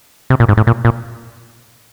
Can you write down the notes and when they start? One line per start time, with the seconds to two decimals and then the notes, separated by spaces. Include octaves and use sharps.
0.30 C3
0.40 A#2
0.48 G#2
0.57 A2
0.67 A#2
0.85 A#2